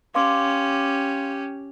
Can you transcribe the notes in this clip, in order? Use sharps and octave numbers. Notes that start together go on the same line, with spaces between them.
C#4 G4 F5 C6 D6